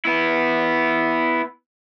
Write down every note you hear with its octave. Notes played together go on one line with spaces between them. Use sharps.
B3 E4